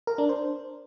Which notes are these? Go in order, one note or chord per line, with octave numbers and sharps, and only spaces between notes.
A#4
D4
C5